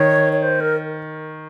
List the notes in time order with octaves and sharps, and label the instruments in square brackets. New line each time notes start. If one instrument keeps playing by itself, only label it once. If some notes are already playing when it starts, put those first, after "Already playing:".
Already playing: [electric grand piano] D#3 [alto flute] C#5
[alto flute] C#5
C5
A#4